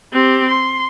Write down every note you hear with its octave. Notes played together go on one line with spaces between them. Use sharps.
C4 G4
C6